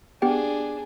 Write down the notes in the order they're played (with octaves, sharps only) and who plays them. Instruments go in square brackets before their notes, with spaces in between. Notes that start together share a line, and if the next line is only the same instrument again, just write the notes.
[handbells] B3 G4 G5 [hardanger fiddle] D4 G#4